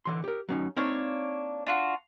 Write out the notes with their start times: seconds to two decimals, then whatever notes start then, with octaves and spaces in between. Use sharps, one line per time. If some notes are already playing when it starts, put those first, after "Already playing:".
0.05 D3 E3 C6
0.24 G4 A#4
0.49 F#3 C#4 D#4
0.77 A#3 C4 D4 D#4 C#5
1.67 D4 F4 F#4